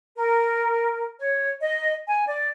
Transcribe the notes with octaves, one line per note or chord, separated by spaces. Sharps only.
A#4
C#5
D#5
G#5
D5